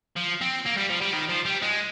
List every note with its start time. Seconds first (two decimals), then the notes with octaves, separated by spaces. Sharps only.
0.16 F3
0.41 C4
0.66 A#3
0.77 G3
0.89 F3
1.01 G3
1.13 D#3
1.29 F3
1.45 G3
1.62 G#3